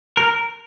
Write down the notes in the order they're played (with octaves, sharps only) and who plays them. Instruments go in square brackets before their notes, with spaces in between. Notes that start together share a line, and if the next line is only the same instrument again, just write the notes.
[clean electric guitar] A#4